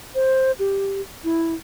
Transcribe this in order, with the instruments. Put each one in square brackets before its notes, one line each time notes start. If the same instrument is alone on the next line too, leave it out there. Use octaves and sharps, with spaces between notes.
[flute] C5
G4
E4